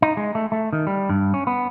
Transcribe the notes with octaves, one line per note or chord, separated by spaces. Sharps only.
D#4
G#3
A3
A3
D#3
G3
G2
C#4
B3